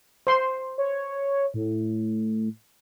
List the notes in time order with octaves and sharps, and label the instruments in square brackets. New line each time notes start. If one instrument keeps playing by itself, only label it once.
[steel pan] C5 C6
[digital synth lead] C#5
A2